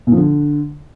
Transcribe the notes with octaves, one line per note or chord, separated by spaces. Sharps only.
A#2
F3
D3